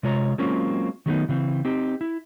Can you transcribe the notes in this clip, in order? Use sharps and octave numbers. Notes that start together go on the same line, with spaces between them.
C3 G#3 F4 C#5 A#5
F#3 G#3 A#3 C4 C#4 F4
D#3 F#3 G#3 A3 B3 D#4
C#3 E3 C4
C4 D#4 G4
E4